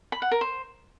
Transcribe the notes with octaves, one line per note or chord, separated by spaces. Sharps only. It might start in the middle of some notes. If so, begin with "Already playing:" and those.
B5
F#5
A#4
C5